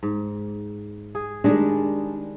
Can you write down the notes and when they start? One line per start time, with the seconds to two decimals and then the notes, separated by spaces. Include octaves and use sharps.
0.03 G#2
1.15 G#4
1.44 D#3 G3 G#3 D4 G#4